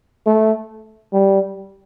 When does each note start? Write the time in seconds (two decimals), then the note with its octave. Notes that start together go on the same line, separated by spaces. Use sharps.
0.26 A3
1.13 G3